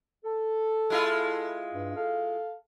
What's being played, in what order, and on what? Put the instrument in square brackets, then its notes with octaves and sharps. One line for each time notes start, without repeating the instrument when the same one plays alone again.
[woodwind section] A4
[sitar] G#3 E4 F4
[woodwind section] G2
A4 F5